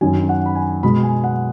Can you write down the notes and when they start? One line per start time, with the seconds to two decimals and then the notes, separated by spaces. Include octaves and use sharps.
0.01 F#2 D#3 F#3 G#5
0.29 F#5
0.46 B5
0.55 G#5
0.83 B2 G#3 B5
1.03 G#5
1.24 F#5